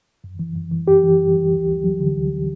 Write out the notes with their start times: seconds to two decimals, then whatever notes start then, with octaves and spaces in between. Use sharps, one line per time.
0.24 F#2
0.39 E3
0.56 F#2
0.71 E3
0.88 F#2 G4
1.04 E3
1.20 F#2
1.36 E3
1.53 D2
1.68 D2
1.84 F#3
2.00 D3
2.17 D2